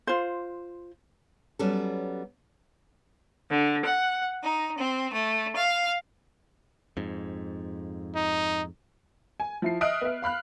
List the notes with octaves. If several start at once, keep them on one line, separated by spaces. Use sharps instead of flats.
F4 C5
F#3 G3 B3 C#4 A4
D3
F#5
D#4
C4
A3
F5
F2 G#2
D#4
G#5
F3 E4 C7
D#5 E5 D#6 F6 F#6 D7
B3 E5
F5 B5 F6 F#6